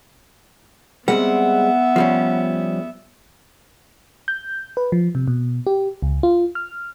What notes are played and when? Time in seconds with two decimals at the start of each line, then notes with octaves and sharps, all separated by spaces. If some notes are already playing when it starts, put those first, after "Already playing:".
1.08 G3 G#3 B3 C4 E5 F#5
1.96 F3 G3 C#4
4.28 G6
4.77 B4
4.92 F3
5.15 C3
5.28 B2
5.67 G4
6.02 C#2
6.23 F4
6.55 F6